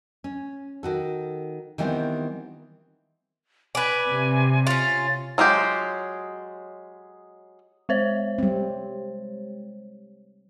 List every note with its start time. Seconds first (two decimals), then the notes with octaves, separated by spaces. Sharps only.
0.24 C#4
0.83 D#3 F#4 A4
1.78 D#3 E3 G3 B3 C4 F4
3.75 B4 D5 G#5
4.09 C3
4.67 C#4 F4 A6
5.38 F#3 G#3 F4 G4
7.89 G#3 C5 C#5
8.38 G3 C4